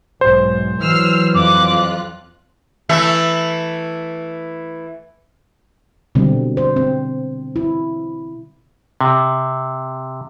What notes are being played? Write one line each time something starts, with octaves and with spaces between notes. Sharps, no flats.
B1 G#2 C5
E3 F#3 E6 F6 C7
F2 F4 D6 F#6
E3 A3 E5
B2 D3 G3 C4
C5
C4
E4
C3